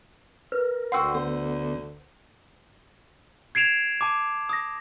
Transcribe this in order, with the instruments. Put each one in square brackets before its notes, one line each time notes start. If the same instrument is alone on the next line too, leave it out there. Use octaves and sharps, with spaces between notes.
[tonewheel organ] A#4 [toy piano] B4
[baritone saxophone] D2 [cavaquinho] F#4 G5 C6 [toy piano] F#5 E6
[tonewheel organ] D3 B3 [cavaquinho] C5
[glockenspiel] G#6 C7 D7 E7 F7
A5 D6
D#6 A#6